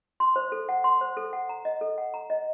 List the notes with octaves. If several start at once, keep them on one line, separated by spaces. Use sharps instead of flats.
C6
C5
A4
F#5
C6
C5
A4
F#5
A#5
D#5
A4
F#5
A#5
D#5